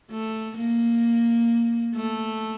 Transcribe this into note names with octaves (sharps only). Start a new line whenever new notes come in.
A3
A#3
A3